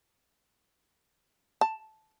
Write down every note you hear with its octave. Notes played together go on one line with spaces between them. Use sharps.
A5